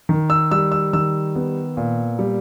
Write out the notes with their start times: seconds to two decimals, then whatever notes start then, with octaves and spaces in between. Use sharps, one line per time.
0.09 D#3
0.30 E6
0.51 G3 E6
0.72 E6
0.93 D#3 E6
1.36 B3
1.77 A#2
2.19 G3